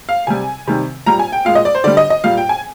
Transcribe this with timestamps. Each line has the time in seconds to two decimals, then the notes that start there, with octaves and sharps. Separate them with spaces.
0.09 F5
0.27 C3 G3 G#5
0.67 C3 D#3 G3
1.06 A#2 G3 A#5
1.19 G#5
1.32 G5
1.45 A#2 G#3 F5
1.55 D#5
1.65 D5
1.75 C5
1.84 D3 G3 D5
1.97 D#5
2.10 D#5
2.24 A#2 G3 F5
2.37 G5
2.49 G#5